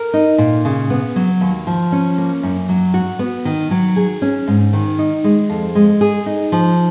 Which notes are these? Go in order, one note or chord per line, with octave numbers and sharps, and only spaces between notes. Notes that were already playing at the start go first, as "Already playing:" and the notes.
Already playing: A#4
D#4
A#2
C#3
B3
F#3
D#2
F3
C#4
A#3
F#2
F#3
F#4
B3
D#3
F#3
G#4
C#4
G#2
D#3
D#4
G#3
F2
G#3
G#4
D#4
F3